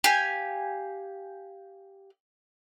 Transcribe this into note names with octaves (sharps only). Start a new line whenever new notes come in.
G4 F5 G#5